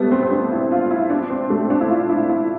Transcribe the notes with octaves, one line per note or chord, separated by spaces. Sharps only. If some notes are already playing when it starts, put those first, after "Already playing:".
Already playing: G3 A3 B3
C4
C4
D4
E4
F4
E4
D4
C4
A3
D4
E4
F4
E4
E4